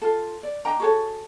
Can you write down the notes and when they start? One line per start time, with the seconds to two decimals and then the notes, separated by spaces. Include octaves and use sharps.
0.02 F4 A4
0.43 D5
0.65 D4 D#5 G5 A#5
0.80 F#4 G#4 A4 C#5